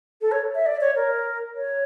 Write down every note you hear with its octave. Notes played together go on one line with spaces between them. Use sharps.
A4
C#5
E5
D5
C#5
A#4
C#5